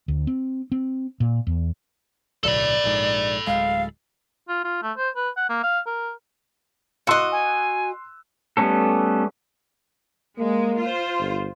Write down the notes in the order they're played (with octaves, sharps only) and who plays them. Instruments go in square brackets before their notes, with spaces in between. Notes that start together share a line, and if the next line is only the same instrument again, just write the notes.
[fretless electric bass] D2
C4
C4
A#2
E2
[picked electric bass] D1 B1 [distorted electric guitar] A4 B5 [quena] D5
[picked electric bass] A#1 G#2
[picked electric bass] D1 G#3 [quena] F5
[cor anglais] F4
F4
A3
C5
B4
F#5
A#3
F5
A#4
[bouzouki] F#4 D#5 [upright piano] C6 E6 F#6
[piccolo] G#5
[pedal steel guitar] G3 A3 B3 C#4 A4
[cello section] G#3 [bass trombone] A#3
[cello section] F4 C5
[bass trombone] G1